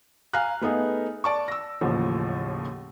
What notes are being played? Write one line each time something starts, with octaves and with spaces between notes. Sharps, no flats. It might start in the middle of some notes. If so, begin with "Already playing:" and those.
F5 G#5 A#5 F6 F#6
A3 B3 D#4 G#4 B4
D5 A5 C#6
E6 A#6
A1 D#2 A2 C#3 F3